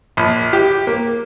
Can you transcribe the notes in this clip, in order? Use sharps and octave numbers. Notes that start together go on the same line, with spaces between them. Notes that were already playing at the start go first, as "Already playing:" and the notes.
A#1
G4
A#3